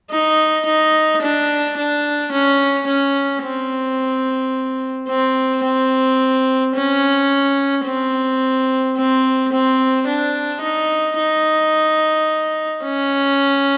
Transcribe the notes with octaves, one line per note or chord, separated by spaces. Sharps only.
D#4
D#4
D4
D4
C#4
C#4
C4
C4
C4
C#4
C4
C4
C4
D4
D#4
D#4
C#4